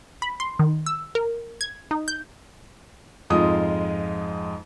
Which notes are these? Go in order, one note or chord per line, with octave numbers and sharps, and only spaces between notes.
B5
C6
D#3
E6
A#4
G#6
D#4
G6
F2 G#2 G#3 F4 D#6